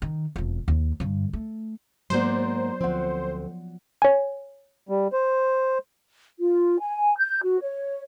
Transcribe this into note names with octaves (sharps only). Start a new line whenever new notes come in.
D#3
E1 F2
D#2
G2 D3
A3
G#2 F#3 A#3 B3 F#4 C5 D5
D2 F3 C4 F#5
C#5 G#5
G3
C5
F4
G#5
G6
F#4
C#5